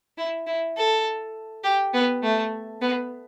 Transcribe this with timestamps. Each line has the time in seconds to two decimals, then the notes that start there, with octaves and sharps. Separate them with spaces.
0.17 E4
0.47 E4
0.77 A4
1.64 G4
1.93 B3
2.22 A3
2.81 B3